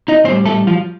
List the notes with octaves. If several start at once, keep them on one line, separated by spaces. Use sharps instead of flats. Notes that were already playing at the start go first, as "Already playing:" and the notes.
D#4 D#5
A2 G3 C4 C5
A3 A4
F3 F4